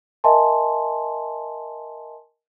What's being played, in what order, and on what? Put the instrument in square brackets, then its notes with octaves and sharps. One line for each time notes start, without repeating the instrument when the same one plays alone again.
[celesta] A#4 D#5 E5 G#5 A5 C6